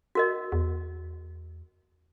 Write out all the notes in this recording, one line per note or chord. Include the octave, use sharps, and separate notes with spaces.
F#4 A#4 D#5
E2